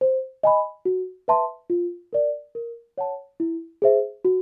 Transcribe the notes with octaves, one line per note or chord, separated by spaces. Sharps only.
C5
D#5 G#5 B5
F#4
B4 E5 A5 C6
F4
A#4 D5
A#4
C#5 F#5 A5
E4
G#4 C5 E5
F#4